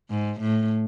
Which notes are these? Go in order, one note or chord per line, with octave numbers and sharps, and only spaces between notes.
G#2
A2